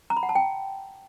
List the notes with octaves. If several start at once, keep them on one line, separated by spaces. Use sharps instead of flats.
A#5
B5
F#5
A5
G5